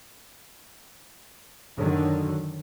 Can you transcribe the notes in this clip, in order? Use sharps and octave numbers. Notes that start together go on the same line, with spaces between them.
F#2 D3 D#3 F#3